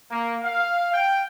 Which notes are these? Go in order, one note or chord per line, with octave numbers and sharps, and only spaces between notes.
A#3
F5
G5